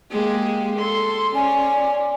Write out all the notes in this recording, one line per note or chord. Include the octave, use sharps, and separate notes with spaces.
G#3 A#3 G4
A4 C6
C#4 D5 G#5